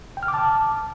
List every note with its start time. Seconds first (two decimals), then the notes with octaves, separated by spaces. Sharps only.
0.17 G5
0.23 F6
0.28 D6
0.34 A5